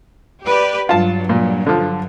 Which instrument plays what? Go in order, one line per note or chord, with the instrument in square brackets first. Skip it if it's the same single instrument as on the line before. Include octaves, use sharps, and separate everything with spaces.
[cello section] G4 B4 D5
[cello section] G2 F#3 [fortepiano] F4 A5
[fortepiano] A#2
D3 F3